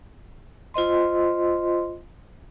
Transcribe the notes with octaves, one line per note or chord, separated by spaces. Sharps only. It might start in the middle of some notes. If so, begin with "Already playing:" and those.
F4 C5 D#5 C6